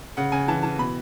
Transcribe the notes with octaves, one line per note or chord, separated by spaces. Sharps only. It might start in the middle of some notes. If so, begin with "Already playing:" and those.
C#3 F#5
C#3 G#5
E3 A5
E3 A5
B2 B5